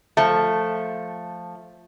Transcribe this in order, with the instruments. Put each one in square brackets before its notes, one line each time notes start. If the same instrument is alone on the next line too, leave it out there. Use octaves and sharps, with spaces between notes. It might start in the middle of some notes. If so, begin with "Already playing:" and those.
[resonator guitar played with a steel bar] F3 A3